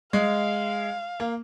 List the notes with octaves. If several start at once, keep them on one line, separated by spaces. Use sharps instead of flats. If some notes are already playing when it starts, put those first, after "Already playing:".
G#3 F5
A#3